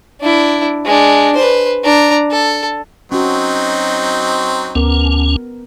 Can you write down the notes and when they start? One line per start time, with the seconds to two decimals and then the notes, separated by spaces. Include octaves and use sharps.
0.21 D4 E4
0.85 G#3 D4
1.36 B4 C5
1.84 D4 A#5
2.31 A4
3.12 F#3 C4 C#4 D#4 F#4
4.75 D2 B3 C#4 A#4